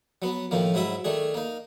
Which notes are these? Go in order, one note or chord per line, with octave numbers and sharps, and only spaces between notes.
F#3 B3
A2 D#3 F3 A#3
G#2 F#3 E4 E5 D#6
D#3 A3 D4 G#4
A#3 D#4